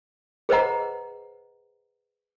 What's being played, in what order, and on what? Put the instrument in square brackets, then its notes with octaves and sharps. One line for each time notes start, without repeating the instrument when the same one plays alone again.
[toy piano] G#4 B4 C5 D#5 F#5 A#5